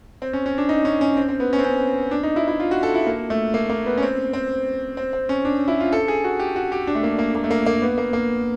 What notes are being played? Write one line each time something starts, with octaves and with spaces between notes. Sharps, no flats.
C4
C#4
C#4
D4
D#4
C#4
C#4
C4
C4
B3
C#4
C4
C#4
D4
D#4
E4
E4
F4
F#4
A4
E4
A#3
A3
A#3
A#3
B3
C#4
C4
C4
C4
C4
C#4
D4
E4
F4
A4
G#4
F#4
G4
F#4
G4
D4
A3
A#3
A#3
A#3
A3
A#3
A#3
B3
A#3
A#3